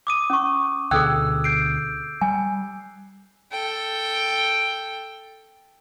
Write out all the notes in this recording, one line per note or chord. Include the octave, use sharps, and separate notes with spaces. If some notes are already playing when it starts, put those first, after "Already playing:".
D6 D#6 D#7
C#4 C#6
D2 B2 G#4 A4 G5 E6 F#6 G#6
G6 C7 D7
G3 G#5
A4 G5